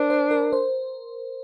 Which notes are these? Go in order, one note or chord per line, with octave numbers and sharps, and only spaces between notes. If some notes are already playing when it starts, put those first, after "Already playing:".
Already playing: D4 A#4 C5
C5
A#4
C5